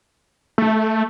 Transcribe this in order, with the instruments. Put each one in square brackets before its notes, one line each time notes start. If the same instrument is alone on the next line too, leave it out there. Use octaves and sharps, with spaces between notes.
[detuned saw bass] A3